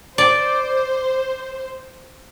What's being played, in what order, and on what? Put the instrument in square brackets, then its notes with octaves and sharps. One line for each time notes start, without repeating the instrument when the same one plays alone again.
[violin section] C5 [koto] D5